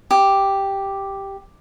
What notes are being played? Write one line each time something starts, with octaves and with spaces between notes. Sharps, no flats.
G4